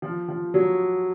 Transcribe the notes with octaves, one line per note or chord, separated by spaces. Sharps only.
F3
F3
F#3